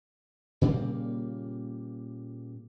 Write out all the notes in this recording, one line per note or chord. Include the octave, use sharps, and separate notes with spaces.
A#2 C#3 G3 A#3